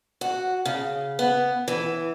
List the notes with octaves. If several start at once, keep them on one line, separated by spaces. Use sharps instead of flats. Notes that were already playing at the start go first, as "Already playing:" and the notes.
F#4
C#3
B3
E3